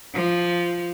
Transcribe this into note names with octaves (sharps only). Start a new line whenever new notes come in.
F3